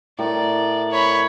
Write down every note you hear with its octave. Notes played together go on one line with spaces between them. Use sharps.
A2 A#4 D5
C#5 B5